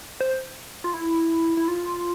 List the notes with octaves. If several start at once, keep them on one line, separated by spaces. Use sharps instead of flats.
C5
F4
E4
E4
F4